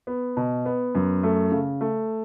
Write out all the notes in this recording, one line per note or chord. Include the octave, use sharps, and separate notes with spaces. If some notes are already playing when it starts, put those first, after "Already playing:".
B3
B2
B3
F#2
A3
C#3
A3